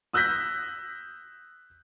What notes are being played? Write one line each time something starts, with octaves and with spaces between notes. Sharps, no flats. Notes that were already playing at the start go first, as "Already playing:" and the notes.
D#6 E6 F#6 G6 A#6 B6